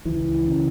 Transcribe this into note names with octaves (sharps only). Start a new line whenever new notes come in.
C#2 E3
C#3